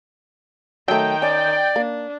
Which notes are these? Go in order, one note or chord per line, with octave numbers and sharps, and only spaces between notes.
D#3 F#3 A3 G5
C#4 D5
A#3 D4